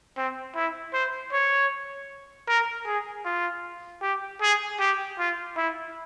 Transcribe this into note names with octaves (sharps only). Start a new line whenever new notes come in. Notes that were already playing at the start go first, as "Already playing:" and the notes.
C4
E4
C5
C#5
A#4
G#4
F4
G4
G#4
G4
F4
E4